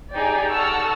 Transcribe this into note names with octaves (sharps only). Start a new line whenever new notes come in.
D#4 G4 G#4 D5 G5
A4 F#5 A5 C#6 E6 F6